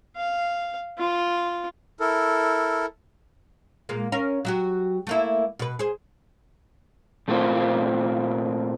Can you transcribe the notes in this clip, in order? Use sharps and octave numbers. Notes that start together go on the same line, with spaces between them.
F5
F4
E4 A4 A#4
A#2 G#3 A#3
C#4 A#4 F5
F#3 F#4 G4
A3 A#3 E4
B2 B4
G#4 C5
A#2 A3 A#3 C4 F4